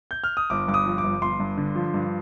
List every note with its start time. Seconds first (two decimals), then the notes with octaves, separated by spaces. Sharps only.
0.11 G6
0.24 F6
0.37 D#6
0.50 G1 D6
0.68 G2 D6
0.74 D#6
0.86 F3
0.98 D6
1.04 G1
1.22 G1 C6
1.40 G2
1.58 D3
1.75 F3
1.94 G2